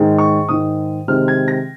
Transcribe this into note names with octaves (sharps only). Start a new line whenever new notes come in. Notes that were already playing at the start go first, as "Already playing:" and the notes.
Already playing: G#2 D#3 G#3
C#6
G#2 D#3 G#3 D#6
C3 D#3 G#3 C4 F6
G#6
A#6